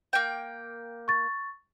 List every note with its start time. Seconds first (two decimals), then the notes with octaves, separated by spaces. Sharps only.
0.13 A#3 G5
1.08 C#6 A6